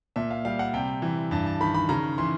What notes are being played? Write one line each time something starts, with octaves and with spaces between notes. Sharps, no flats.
A#2 E5
F5
G3 F5
F#5
C3 G5
E3
G2 A5
A5
D#3 B5
B5
C#3 A#5
E3 C6